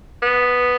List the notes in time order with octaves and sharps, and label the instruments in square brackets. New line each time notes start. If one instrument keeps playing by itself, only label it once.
[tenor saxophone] B3